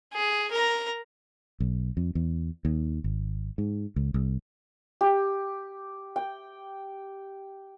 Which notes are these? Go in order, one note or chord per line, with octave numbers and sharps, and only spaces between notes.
G#4
A#4 A#5
B1
F2
E2
D#2
G#1
G#2
C#2
C2
G4
G5